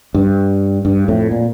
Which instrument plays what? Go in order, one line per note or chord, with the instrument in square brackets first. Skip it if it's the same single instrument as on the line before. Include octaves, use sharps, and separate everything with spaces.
[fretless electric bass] G2
G2
F2 A2
A#2